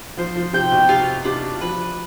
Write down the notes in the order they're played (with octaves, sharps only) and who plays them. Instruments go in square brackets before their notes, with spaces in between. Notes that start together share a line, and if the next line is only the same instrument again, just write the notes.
[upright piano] F3 [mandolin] C5
[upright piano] F3
[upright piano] C3 [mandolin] G5
[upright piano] B2
[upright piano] C3 [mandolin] F4
[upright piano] C3 [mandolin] D4
[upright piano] F3 [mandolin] B4